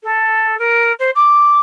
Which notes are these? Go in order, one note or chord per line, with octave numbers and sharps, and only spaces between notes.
A4
A#4
C5
D6